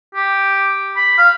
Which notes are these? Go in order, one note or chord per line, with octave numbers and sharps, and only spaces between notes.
G4
B5
F5